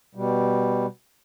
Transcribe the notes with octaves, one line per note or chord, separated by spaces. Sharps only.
B2 G3